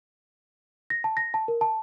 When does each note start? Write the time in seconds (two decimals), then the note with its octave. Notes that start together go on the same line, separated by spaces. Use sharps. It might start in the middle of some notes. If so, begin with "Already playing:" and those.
0.90 A#6
1.04 A5
1.17 A#6
1.34 A5
1.48 A#4
1.61 A5